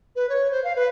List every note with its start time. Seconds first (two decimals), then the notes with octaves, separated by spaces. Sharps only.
0.16 B4
0.29 C#5
0.51 C5
0.64 F5
0.76 B4